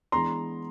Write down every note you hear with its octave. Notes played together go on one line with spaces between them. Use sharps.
E3 G#3 B3 D4 A#5 C6